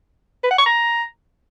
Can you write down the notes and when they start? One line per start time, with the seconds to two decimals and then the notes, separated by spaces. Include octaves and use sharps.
0.43 B4
0.51 F#5
0.58 C#6
0.66 A#5